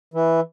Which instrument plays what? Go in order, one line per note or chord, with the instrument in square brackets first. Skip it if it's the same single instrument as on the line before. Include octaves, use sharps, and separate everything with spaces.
[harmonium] E3